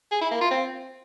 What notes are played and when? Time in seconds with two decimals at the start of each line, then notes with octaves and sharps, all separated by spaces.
0.11 G#4
0.21 E4
0.31 A#3
0.41 F4
0.51 C4